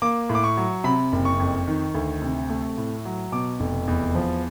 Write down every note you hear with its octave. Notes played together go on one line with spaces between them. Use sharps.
A#3 D6
A2
D6
C#6
F#3
C3 B5
F#1
C#6
F2
D#3
D2
C3
A3
A2
F#3
B2 D6
F1
E2
F3